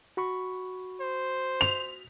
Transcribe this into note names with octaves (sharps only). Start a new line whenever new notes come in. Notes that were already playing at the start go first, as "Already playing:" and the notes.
F#4 B5 C#6
C5
F7